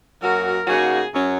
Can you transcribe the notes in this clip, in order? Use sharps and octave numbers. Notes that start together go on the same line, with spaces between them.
F#2 F#3 A#3 F#4 A#4
C#3 A#3 D#4 F#4 G#4
F#2 F#3 C#4